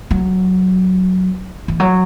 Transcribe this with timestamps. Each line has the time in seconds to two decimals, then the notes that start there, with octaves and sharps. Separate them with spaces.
0.11 F#3
1.68 E3
1.80 F#3